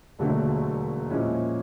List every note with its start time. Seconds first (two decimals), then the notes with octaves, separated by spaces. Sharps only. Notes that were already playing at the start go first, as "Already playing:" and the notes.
0.19 E1 D#2 D3 F#3 A3
1.10 A#2 F3 G#3 C#4 E4